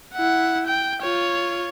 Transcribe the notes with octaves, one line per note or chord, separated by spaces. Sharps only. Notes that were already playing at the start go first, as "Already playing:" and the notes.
E4 F#5
G5
F4 C#5